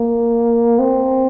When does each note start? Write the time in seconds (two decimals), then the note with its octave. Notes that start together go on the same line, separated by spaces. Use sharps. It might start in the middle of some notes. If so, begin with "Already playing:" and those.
Already playing: A#3
0.79 C4